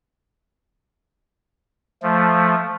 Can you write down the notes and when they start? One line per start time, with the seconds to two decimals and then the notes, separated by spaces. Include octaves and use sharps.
2.03 F3 A3